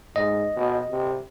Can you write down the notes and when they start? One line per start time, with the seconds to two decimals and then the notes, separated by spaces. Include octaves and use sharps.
0.16 G#2 D#5
0.56 B2
0.91 C3